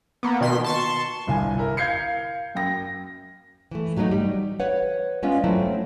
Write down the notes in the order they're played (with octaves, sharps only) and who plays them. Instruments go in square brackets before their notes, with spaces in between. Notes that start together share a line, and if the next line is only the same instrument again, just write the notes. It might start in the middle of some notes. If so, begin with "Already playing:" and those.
[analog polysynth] A#3 B3
B2 D#3 C6 B6
A5 C6 C#6
[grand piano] G1 C2 G#5
E4 A#4
F5 G6 G#6 C7 C#7
F#2 G5 A#6
[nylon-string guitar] E3 A3
A2 F#3 A3 C#4 D#4
G3
B4 C#5 F#5
G#3 B3 C#4 F4 D5 F5
F#3 A3 C4 E4